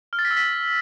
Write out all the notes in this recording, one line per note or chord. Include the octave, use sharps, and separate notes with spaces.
F6
A6
B6
E6
B6